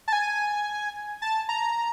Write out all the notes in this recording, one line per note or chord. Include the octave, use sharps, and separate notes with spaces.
A5
G#5
A5
A#5